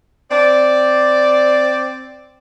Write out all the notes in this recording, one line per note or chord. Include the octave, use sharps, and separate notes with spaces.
C4 D5